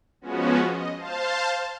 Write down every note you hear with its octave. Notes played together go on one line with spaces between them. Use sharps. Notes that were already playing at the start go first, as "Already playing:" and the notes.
F3 G#3 B3 C#4 F#4
D#5
C5 F5 A5